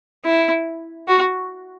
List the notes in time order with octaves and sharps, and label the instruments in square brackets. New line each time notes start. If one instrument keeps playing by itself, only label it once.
[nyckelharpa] E4
F#4